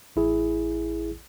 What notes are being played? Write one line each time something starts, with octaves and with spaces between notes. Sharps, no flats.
A1 E4 G#4